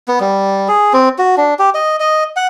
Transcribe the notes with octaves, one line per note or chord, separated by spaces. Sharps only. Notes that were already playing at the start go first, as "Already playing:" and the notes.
B3
G3
G#4
C4
F#4
D4
G4
D#5
D#5
F#5